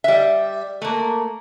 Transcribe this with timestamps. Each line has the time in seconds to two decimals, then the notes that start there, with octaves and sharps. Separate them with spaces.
0.04 G3 E5
0.82 A3 A#3